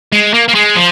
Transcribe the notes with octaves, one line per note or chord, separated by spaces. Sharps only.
G#3
A#3
A#3
G#3
F3